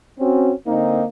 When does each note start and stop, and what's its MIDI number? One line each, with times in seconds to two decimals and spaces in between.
0.19 0.52 60
0.19 0.52 61
0.19 0.52 66
0.66 1.04 50
0.66 1.04 58
0.66 1.04 60
0.66 1.04 63